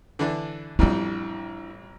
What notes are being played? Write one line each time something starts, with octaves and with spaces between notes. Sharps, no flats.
D3 E3 D4
A1 F2 G3 D4 E4